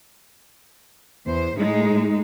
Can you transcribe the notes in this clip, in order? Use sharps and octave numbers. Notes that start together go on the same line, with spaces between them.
E2 C5
A2 G#3 D#4